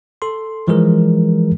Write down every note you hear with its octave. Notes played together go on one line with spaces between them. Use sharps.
A4 C6
E3 F3 G#3 G#4 A#4